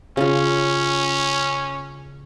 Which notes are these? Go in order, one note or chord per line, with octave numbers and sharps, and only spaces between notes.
C#3 C#4 F4